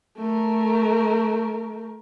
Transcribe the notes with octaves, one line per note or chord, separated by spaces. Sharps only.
A3 A#4